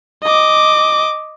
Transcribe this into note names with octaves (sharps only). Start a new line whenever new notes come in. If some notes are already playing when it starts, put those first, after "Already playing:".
D#5 D6